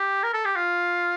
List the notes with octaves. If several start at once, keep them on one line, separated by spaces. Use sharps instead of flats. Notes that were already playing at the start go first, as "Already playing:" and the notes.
Already playing: G4
A#4
A4
G4
F4